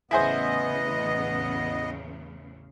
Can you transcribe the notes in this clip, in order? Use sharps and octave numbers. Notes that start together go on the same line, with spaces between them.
A1 E2 C#3 B3 E4 G#4 C5 D#5